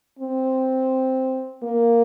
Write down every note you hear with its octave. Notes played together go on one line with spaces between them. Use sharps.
C4
A#3